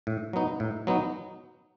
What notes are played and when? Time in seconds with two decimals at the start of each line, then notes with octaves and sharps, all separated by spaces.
0.07 A2
0.33 F#3 B3 D#4
0.60 A2
0.87 F#3 B3 D#4